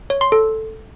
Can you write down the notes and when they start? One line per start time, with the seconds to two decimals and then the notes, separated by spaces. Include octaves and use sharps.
0.10 C#5
0.21 C6
0.32 A4